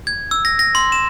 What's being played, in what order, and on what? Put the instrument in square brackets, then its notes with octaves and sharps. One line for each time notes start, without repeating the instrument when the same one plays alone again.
[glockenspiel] G#6
E6
A#6
A#6
C6
E7